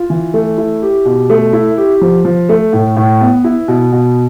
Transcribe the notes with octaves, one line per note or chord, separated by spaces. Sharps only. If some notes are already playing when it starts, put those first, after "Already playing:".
Already playing: F4
E3
A3
E4
G4
B2
A3
E4
G4
F3
F3
A3
A2
A2
B3
E4
B2
B2